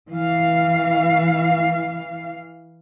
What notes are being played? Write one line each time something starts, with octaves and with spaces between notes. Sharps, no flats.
E3 F5